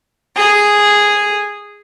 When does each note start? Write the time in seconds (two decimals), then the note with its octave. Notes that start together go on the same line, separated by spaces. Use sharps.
0.35 G#4